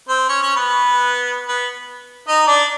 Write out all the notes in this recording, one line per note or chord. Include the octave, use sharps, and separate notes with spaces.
C4 C5
C#4 C#5
C#4 C#5
B3 B4
B3 B4
D#4 D#5
D4 D5